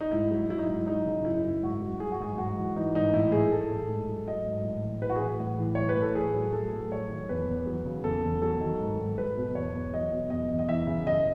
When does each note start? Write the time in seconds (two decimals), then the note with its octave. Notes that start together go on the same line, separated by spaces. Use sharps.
0.01 D#4
0.11 G#2 E4
0.31 F#3
0.49 F#3 E4
0.58 D#4
0.67 G#2 E4
0.87 F#3 D#4
1.06 C#3
1.25 F#2 E4
1.45 F#2
1.63 G#2 F#4
1.81 F#3
2.00 F#3 G#4
2.12 F#4
2.20 G#2 G#4
2.38 G#2 F#4
2.57 E3
2.76 E3 D#4
2.95 G#2 D#4
3.13 A2 E4
3.32 E3 G#4
3.51 E3 A4
3.71 A2
3.89 G#2
4.08 F#3
4.27 F#3 D#5
4.46 G#2
4.64 A2
4.84 E3
5.02 E3 B4
5.10 F#4
5.16 G#4
5.21 A2
5.40 A2
5.59 E3
5.75 E3 C#5
5.89 B4
5.96 A2
6.02 A4
6.15 A2 G#4
6.35 F#3
6.53 F#3 A4
6.73 A2
6.91 F#3 C#5
7.10 D#3
7.29 E2 B4
7.48 E2
7.66 F#3
7.86 C#3
8.04 E2 A4
8.23 E2
8.42 F#3 A4
8.60 D#3
8.80 G#2
8.99 G#2
9.18 F#3 B4
9.37 B2
9.55 E2 C#5
9.75 E2
9.93 F#3 D#5
10.12 B2
10.30 E2 D#5
10.50 E2
10.59 D#5
10.69 E3 E5
10.87 C#3
11.07 F#2 D#5